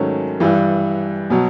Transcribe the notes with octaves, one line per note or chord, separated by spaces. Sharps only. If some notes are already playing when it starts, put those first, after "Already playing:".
Already playing: G#2 D#3 F#3 A3 C#4
G2 E3 G3
B2 F#3